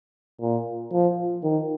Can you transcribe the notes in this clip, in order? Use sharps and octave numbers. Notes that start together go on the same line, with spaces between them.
A#2
F3
D#3